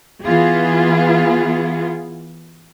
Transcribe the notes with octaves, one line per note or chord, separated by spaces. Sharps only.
E3 B3 F4 G#4